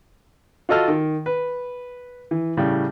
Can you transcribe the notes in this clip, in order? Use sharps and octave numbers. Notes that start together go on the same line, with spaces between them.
F4 F#4 A4 D#5 A5 F6
D#3
B4
E3
A2 C#3 G3